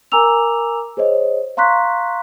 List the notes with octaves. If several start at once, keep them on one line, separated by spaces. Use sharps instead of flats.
A#4 G#5 A#5 D6 E6 F7
G#4 C5 C#5 D#5
F5 A#5 C6 C#6 F#6 B6